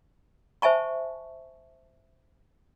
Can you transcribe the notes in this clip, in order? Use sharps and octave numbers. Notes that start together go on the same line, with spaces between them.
C5 E5 G#5 A5 C#6